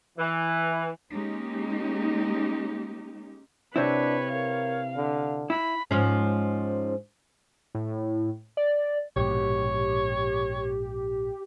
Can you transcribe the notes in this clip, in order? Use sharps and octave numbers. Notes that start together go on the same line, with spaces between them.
E3
G#3 A#3 C#4 D#4 G4
C3 C4 D4 E4 B4 C#5
A#4 F5
D3
E4 B5
G#2 F3 C#4
A2
D5
A#1 G#2 B2 G4 C#5